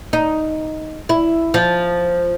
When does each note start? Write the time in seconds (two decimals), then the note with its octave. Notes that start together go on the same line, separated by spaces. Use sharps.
0.13 D#4
1.09 E4
1.54 F3